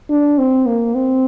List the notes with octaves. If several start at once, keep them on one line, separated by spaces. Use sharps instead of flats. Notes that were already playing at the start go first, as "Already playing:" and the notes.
D4
C4
A#3
C4